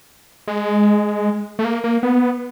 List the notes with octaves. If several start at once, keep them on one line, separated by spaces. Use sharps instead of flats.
G#3
A3
A#3
A#3
B3